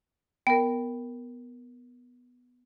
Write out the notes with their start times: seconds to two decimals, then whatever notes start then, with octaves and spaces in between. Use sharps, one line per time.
0.47 B3 A#4 G5